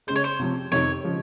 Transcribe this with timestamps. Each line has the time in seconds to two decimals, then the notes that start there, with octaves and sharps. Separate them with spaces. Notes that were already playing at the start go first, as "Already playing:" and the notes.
0.07 C#3 G#3 C#4 C5
0.16 C#5
0.24 C5
0.39 C3 F3 C4
0.72 F2 C3 D#3 C#5
1.03 C#3 F3 G#3